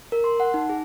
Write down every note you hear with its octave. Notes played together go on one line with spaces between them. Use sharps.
A#4
C6
F#5
D#4
G#4